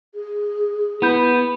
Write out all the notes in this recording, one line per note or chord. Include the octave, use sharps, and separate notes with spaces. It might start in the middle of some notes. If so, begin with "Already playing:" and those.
G#4
B3 E4 B5 G6